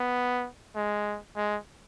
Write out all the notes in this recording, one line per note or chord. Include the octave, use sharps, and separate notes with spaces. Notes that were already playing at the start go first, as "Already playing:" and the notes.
Already playing: B3
G#3
G#3